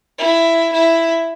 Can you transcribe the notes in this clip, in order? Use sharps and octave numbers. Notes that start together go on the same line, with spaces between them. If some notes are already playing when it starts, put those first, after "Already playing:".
E4
E4